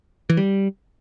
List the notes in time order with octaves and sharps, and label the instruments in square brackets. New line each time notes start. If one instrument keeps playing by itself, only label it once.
[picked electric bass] E3
G3